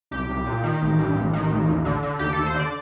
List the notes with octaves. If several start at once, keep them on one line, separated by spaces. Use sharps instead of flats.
C2 G4
C2
A#2
D#3
A1
G2
A1
D#3
A1
D#2
D3
D3
D#2 G4
D#2 A4
C5
D3
D5